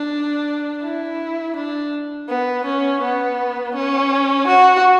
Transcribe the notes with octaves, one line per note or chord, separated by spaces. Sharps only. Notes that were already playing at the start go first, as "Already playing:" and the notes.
Already playing: D4
E4
D4
B3
C#4
B3
C#4
F#4